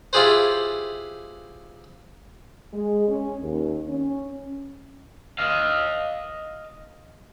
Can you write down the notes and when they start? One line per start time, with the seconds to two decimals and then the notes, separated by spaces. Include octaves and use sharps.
0.13 E4 F4 G4 G#4 B4 C5
2.73 G#3
3.08 C#4
3.41 D#2
3.88 C#4
5.39 D#5 F5